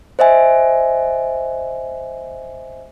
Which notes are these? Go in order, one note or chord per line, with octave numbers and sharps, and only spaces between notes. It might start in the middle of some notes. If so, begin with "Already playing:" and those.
C5 D#5 E5 G#5